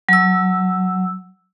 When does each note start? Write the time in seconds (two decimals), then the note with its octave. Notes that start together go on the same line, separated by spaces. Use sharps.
0.09 F#3 E6